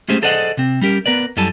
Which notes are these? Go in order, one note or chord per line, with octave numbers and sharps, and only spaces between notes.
G#3 A3 C#4 G4 G#4 C5
G#4 A4 C5 D5 D#5 F#5
C3 C4
G3 C#4 G4 A#4
B3 A#4 B4 D5
F#2 G3 E4 A4 G#5 A5